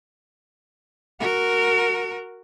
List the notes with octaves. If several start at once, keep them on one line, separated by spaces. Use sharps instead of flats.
F#4 A#4